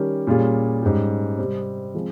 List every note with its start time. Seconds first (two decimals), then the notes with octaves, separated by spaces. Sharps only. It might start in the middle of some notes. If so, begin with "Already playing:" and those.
Already playing: D#3 G3 C#4 G4 A#4
0.27 A#2 G3 C#4 F4 G#4
0.83 G#2 G3 C#4 G4
1.38 C3 G3 C4
1.94 F3 G#3 C4